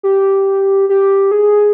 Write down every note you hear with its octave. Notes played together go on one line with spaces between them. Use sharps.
G4
G4
G#4